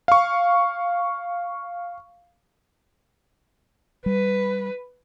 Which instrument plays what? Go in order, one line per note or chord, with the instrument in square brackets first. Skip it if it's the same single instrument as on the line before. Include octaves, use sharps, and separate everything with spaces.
[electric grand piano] F5 C#6
[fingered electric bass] G3 [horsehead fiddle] B4